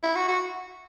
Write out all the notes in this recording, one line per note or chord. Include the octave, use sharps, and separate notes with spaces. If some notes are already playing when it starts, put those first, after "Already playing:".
E4
F#4
F#4